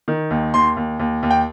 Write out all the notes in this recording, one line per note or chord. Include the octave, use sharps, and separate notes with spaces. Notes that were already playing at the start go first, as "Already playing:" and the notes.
D#3
D#2
D#2 C6
D#2
D#2
D#2
G5